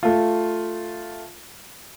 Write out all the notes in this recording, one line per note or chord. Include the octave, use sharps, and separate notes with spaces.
A3 F4